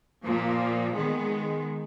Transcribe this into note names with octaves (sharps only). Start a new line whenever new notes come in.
A#2 F3 A#3
D#3 G#3 B3